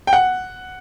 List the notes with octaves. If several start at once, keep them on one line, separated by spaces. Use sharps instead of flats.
G5
F#5